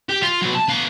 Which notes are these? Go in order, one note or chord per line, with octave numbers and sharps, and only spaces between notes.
G4
F4
B2 F#3
A5
B3 F5